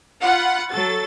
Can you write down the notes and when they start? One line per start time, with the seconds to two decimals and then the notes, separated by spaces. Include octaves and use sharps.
0.21 F4 F#5 B5
0.69 F#3 A4 A6